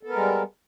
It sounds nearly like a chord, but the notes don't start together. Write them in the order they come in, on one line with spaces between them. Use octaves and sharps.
A4 B3 A#4 G#3 G3